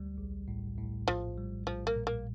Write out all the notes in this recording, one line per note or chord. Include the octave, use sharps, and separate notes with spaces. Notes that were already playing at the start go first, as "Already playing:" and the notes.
Already playing: D2 G3
A#1
A2
A2
A#1 F3
G3
A#1 F3
A#3
A#2
A#3